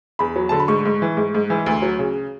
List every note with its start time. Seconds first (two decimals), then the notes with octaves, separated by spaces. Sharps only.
0.19 E2 B5
0.36 F#3
0.49 D3 A5
0.60 B5
0.68 G#2 C#6
0.85 G#2
1.02 E3
1.17 G#2
1.35 G#2
1.50 E3
1.66 D2
1.82 F#3
1.99 C#3